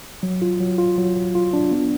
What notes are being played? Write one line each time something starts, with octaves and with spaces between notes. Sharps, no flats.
F#3
F4
F#3
F4
F#3
F#3
F4
D4
B3